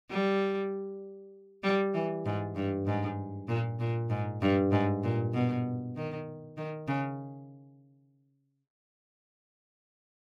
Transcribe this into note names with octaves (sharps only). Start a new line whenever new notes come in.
G3
G3
E3
G#2
G2
G#2
A#2
A#2
G#2
G2
G#2
A#2
B2
D#3
D#3
C#3